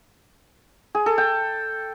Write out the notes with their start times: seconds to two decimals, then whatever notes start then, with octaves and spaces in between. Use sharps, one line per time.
0.95 G#4
1.06 A4
1.18 G5